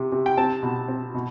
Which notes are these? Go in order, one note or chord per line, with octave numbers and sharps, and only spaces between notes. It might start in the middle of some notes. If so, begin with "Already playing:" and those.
Already playing: C3
C3
G5
C4 A5
B2
C4
B2